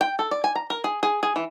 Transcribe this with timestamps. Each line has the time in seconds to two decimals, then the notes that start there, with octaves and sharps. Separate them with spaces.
0.01 G5
0.19 A4
0.31 D5
0.44 G#5
0.55 A#5
0.70 A#4
0.84 G#4
1.03 G#4
1.23 G#4
1.36 E3